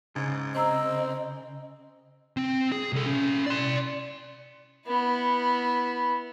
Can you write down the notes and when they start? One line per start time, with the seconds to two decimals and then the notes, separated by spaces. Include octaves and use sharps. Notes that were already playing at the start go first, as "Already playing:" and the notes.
0.16 G#2 C#3
0.55 C4 C5 D#5 A#5 E6
2.37 C4
2.72 G#4
2.93 C2 A4
3.06 C#4 A4
3.47 D5 C6
4.86 B3 E4